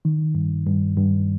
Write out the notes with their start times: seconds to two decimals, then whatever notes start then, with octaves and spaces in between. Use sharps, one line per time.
0.05 D#3
0.35 G2
0.66 G2
0.97 G2